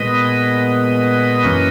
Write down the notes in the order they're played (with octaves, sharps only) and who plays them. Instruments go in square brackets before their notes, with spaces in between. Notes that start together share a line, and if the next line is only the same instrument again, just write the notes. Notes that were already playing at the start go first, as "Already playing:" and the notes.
Already playing: [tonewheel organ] A#2 G#3 B3 B4 D#5
F#2 E3 A#3 C#4